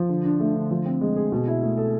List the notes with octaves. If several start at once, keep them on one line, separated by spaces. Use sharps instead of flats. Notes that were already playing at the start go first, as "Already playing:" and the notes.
Already playing: F3
D3
D4
A3
D3
F3
C4
G#3
G#4
B2
E4
A3
A4